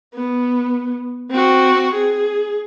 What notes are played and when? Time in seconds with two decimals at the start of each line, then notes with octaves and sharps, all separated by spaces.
0.15 B3
1.31 C4 F#4
1.94 G#4